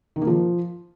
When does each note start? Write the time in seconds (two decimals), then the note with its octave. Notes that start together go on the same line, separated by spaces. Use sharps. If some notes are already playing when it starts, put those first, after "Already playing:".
0.16 D#3
0.22 A#3
0.27 F3